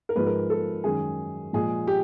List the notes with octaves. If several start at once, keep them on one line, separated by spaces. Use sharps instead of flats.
A#4
G#2 F3 G#3 B4
A#4
A4
F#2 D#3 G#3 G#4
A#2 F3 G#3 G#4
G4